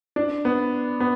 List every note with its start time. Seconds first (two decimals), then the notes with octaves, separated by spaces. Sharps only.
0.16 D4
0.45 B3
1.00 B3